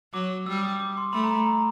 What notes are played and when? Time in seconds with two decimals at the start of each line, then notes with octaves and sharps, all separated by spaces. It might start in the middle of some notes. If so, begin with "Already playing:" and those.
0.14 F#3 D6
0.46 G3 E6
0.58 D6
0.64 D#6
0.69 D6
0.80 D6
0.97 C6
1.13 A3 B5
1.24 A#5
1.36 B5
1.46 A#5